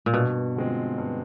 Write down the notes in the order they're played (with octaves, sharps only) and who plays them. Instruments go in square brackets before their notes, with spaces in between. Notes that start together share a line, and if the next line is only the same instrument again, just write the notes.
[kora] A#2
[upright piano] G2 [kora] B2
[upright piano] D3 F3 G#3 C4
G2